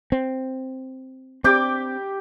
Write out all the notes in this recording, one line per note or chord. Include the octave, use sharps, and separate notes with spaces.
C4
C4 G4 G5 D6